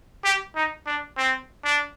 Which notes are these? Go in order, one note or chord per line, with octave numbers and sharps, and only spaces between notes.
G4
D#4
D4
C4
D4